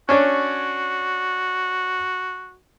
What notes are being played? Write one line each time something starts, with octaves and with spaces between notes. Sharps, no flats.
C#4 D4 F#4 C#5